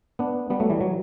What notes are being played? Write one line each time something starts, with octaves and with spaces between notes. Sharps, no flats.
B3 D4
G3 B3
F#3 A3
E3 G3
F#3